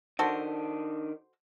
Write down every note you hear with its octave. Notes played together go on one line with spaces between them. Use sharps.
D#3 D4 F#4 A4 C5